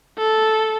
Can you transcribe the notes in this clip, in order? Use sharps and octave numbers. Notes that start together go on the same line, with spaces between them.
A4